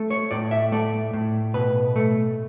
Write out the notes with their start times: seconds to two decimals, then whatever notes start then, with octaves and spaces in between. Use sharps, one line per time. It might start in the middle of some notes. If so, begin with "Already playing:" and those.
Already playing: A3
0.10 C#5
0.31 A2 D5
0.51 E5
0.72 A3 D5
1.13 A2
1.54 B2 B4
1.96 A3